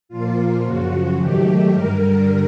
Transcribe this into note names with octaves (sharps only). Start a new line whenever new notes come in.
A#2 F3 A#3 F4
F#2 C#3 F3 F#4
G#2 D#3 F#3 A3 G4
G2 D3 G3 A#4